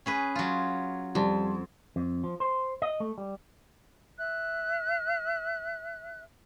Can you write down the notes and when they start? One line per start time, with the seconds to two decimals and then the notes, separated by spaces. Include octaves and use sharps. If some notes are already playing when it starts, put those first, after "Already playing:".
0.06 C#4 G#4 B4
0.35 F#3 F4
1.15 F2 G3 A5
1.96 F2
2.24 F3
2.40 C5
2.82 D#5
3.00 A3
3.18 G3
4.18 E5 F#6